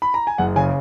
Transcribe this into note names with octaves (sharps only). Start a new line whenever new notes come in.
B5
A#5
G#5
F#1 F#5
C#3 G#5